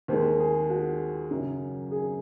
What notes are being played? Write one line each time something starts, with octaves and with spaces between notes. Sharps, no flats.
D#2 D#3 G#3 C5
G#4
F#4
F#2 C#3 F#3
G#4